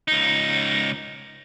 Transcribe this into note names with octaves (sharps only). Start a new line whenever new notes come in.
C#2 D#4